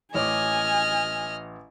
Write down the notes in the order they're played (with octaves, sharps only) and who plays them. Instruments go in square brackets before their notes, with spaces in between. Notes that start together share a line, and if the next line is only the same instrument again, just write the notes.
[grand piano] A1 C#5 D6 [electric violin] D#5 F6 [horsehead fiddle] G#5